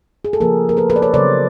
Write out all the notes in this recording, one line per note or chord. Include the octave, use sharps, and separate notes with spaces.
G#4
A4
C#3 F3 A#3 G#4 A#4
A#4
A4 B4
A4 B4
D5
B4 C#5
C#3 F#3 B3 C5 D5